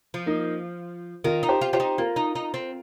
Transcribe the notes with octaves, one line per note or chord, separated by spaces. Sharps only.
F3
A#3 D#4
D#3 F4 A#4
D#4
G4 C5
F4
F4 G4 C5
D#4
A#3 F4 A#4
D#4
D#4
C4